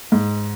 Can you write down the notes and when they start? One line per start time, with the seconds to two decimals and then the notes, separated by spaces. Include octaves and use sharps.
0.12 G#2